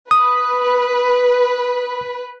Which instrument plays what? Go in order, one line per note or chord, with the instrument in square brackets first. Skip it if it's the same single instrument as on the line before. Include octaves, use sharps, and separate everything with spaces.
[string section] B4 [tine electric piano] D#6